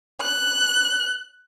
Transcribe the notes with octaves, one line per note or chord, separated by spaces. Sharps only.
F#6